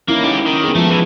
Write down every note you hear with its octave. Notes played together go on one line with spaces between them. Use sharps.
A#3 C#4 D#4 E4
G#2 G4
D#3
B3 G#4
F3 G#3 A3 F4 A4
E3